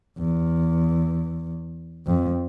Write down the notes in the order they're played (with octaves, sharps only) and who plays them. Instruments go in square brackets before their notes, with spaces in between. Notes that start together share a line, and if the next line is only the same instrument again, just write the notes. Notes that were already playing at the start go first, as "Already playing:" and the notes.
[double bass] E2
F2